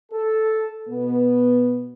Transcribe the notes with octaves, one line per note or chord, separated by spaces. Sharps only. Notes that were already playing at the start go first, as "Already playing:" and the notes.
A4
B2 B3